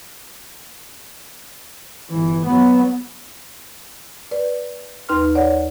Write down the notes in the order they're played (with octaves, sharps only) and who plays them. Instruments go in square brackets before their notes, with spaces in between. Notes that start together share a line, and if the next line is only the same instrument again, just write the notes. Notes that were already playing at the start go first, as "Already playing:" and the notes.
[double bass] G1 E3
F#3 B3
[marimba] B4 D5
D#2 D#4 B4 C6 F6
C#5 D5 F#5